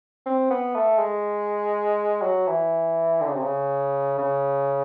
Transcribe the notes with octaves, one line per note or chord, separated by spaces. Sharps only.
C4
B3
A3
G#3
F#3
E3
D3
C#3
C3
C#3
C#3